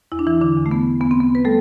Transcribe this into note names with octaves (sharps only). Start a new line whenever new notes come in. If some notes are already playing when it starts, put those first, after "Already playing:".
E2 E4
D4
E3 E4
D3 D4
E2
A3
B3
E2 B3
C4
B3
B4
G3 A3 A4